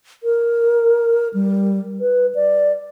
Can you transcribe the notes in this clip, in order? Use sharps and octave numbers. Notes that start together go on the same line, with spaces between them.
A#4
G3
B4
D5